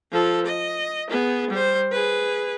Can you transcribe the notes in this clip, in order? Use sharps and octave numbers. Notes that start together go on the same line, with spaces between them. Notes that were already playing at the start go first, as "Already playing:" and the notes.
F3 A4
D#5
B3 G#4
G3 C5
G#4 B4